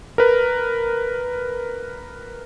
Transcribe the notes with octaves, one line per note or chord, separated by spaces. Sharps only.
A#4 B4